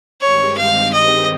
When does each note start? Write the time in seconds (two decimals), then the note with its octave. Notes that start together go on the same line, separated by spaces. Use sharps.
0.21 G2 D#3 G#3 C4 G4 C#5
0.57 F5
0.93 D#5